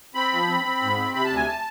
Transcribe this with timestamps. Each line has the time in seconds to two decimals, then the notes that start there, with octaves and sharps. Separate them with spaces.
0.15 C4 B5
0.32 F3
0.48 C4
0.64 C4
0.81 G#2
0.98 C4
1.14 C3 B5
1.25 A5
1.30 D2
1.36 G#5
1.47 A5